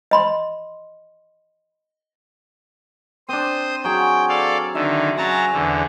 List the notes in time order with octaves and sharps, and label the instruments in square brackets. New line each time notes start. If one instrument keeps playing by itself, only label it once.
[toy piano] D#5 B5 C6
[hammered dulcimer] C4 D4 [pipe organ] C5 D#6
[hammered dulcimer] F#3 G#4 [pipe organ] G5
[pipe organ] A4 D5 F5
[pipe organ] D3 D#3 [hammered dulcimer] E5
[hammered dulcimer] C#3 [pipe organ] F#3 A5 A#5
[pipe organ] E2 D3